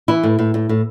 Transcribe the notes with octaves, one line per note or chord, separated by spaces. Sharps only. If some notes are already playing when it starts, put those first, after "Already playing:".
E3 E4
A2
A2
A2
A2